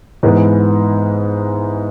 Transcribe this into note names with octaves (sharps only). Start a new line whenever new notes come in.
G#2 E3 G#3 B3